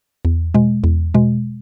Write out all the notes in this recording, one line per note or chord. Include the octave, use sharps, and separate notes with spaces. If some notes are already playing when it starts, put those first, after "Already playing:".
E2
B2 G#3
E2
B2 G#3